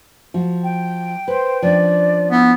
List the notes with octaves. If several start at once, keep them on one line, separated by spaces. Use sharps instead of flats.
F3 F#4
G5
B4 C5
F3 C#4 D4 D5
B3 E4